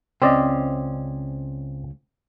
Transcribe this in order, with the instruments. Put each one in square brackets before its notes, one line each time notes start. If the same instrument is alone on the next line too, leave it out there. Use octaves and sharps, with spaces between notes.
[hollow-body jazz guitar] C#2 C#4 C5 [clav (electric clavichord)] C4 D5 D#5